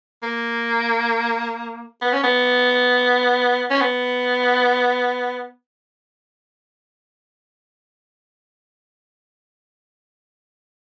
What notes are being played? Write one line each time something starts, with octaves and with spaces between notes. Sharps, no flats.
A#3
B3
C#4
B3
C#4
B3